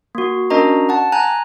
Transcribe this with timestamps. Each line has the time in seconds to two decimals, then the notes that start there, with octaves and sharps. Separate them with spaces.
0.15 A#3 F#4
0.50 C#4 D4 F#4 A#4 D#5 A#5
0.89 F#5 A5
1.12 G#5 A#5 F#6